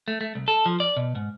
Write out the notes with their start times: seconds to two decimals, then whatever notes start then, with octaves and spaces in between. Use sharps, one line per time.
0.08 A3
0.21 A3
0.35 C2
0.48 A4
0.66 F3
0.80 D5
0.96 B2
1.15 G#2